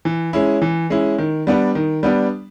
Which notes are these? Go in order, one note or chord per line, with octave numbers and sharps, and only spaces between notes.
E3
G#3 C#4 E4
E3
G#3 C#4 E4
D#3
G3 B3 D4
D#3
G3 B3 D4